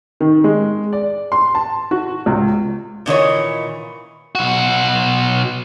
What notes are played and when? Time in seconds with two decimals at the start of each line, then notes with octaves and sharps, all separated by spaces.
0.20 D#3
0.44 G#3
0.93 D5
1.32 C6
1.55 A5
1.91 F#4
2.26 C#2
3.06 A#2 D#3 E3 C#5
4.35 B1 F#4